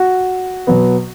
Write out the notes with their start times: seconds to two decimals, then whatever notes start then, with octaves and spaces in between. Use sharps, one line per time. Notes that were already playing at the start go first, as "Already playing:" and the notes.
Already playing: F#4
0.67 B2 F#3 B3